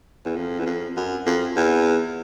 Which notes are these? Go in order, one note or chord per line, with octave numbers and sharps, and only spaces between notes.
E2
F2
E2
F2
F#2
F2
E2